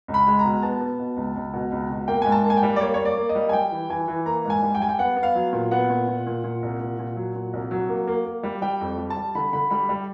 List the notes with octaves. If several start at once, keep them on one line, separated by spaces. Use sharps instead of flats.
C#2
B5
G#3
A#5
B2
B3 A5
B3
B2
C#2
C#2
B2
C#2
B2
A#3 G5
G#2 G#5
A5
A#3
G#5
G5
G3
D5
A#3 C#5
A#3 C#5
D5
A#3
D#5
G3
G#5
G3 G5
E3
E3 G#5
E3
A#3 A#5
G#2
G#5
G3
G5
G3 G#5
G5
B3 F#5
B3
F5
F#3
A#2
B3 F#5
A#2
A#2
A#2
A#2
C2
A#2
A#2
F#3
A#2
C2
F#3
A#3
A#3
A#3
G3
G3 G5
F2
G3
A5
G3
D3 B5
D3 B5
G3 B5
G3